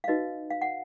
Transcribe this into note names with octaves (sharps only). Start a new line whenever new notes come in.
F5
D#4 F#4 B4 D#5
F5
F#5